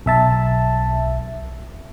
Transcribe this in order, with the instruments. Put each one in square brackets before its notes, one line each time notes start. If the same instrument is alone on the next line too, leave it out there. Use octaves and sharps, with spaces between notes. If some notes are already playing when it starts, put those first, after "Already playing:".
[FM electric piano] B1 E5 A5